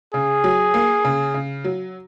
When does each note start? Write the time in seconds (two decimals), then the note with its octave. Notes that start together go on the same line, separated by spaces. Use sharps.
0.14 C#3 G#4
0.44 F#3
0.74 A#3
1.05 C#3
1.34 C#3
1.64 F#3